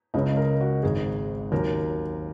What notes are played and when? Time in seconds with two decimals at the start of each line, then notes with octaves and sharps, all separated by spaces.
0.14 C#2 C#3 G#3 C#4 D#5
0.37 A#4
0.61 F#4
0.83 G#1 G#2 D#3 G#4
1.52 D#2 D#3 F#3 C#4 A#4